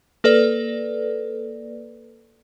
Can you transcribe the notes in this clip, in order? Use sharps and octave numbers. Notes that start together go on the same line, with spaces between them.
A#3 A4 B4 D5